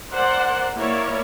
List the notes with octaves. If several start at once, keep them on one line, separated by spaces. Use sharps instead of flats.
A#4 C5 D5 F#5
A#3 E4 A#4 C#5 D5